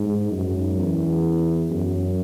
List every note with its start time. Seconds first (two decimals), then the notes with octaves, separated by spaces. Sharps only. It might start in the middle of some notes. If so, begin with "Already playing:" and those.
Already playing: G#2
0.32 F#2
0.79 E2
1.71 F#2